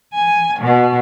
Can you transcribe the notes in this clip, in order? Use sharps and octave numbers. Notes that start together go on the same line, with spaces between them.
G#5
B2